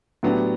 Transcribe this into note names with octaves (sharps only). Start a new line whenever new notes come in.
A2 F#3 B3 D4 G4